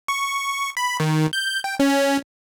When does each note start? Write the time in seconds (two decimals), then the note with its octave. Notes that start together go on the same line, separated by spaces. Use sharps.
0.08 C#6
0.77 B5
1.00 D#3
1.33 G6
1.64 G5
1.80 C#4